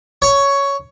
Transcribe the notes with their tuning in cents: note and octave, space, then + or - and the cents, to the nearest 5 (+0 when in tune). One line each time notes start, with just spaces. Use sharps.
C#5 +10